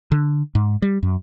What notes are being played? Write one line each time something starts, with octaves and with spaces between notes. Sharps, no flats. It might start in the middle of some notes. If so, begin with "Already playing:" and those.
D3
G#2
G3
F#2